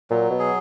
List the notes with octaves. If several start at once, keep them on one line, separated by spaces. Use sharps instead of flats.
A#2 F#3
B2
G#4